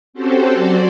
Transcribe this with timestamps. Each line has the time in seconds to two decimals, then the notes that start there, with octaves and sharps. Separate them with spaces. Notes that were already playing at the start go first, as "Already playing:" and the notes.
0.13 C4 C#4 F#4 G4 A4 C5
0.52 F#3 F#4 C5 D5